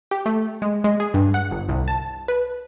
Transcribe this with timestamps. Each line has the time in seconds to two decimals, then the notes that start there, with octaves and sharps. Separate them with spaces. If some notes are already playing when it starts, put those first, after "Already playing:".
0.11 G4
0.26 A3
0.62 G#3
0.84 G#3
1.00 G#4
1.14 G2
1.34 F#5
1.51 G1
1.69 C2
1.88 A5
2.28 B4